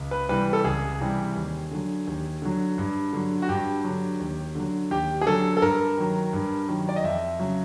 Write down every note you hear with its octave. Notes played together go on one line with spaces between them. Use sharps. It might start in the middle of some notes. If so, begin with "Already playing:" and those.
Already playing: C#2
B4
C3 E3 G3 B4
A4
C#2 G#4
C3 E3 G3
D#2
D3 F#3
D#2
D3 F#3
G2
D3 F#3
F#4
G2 G4
D3 F#3
D#2
D3 F#3
D#2 G4
G#4
D3 F#3 A4
A4
G2 A#4
D#3 F#3
G2
D#3 F#3
D5
D#5
F2 E5
C#3 F#3